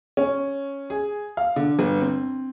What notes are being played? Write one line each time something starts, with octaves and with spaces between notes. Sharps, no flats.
C#4
G#4
F5
D3
G1
C4